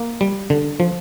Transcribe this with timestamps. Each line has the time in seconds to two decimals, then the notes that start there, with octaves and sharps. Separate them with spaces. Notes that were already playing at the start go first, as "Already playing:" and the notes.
Already playing: A#3
0.21 G3
0.50 D3
0.80 F3